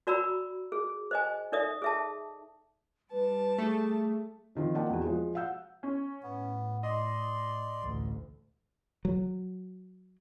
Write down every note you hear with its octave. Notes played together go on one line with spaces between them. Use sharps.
F#4 D5 A#5 B5 E6
G#4
C5 D#5 G#5
D#4 A4 D5 E5 D#6
G#4 E5 A5
G3 B4 A5
A3 G#4
C3 D#3 F3
A#3 F4 D#5 F#5 G5 A5
E2 F#4
F3 G#3
F5 F#5 E6 G6
C#4
A2 B3
D5 D#5 C6
A1 D2
F#3